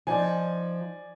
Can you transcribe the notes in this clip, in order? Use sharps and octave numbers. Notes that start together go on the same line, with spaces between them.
F3 D#4 D5 G#5